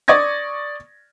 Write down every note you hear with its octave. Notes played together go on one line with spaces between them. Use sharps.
D5 C#6 D#6 G#6 A#6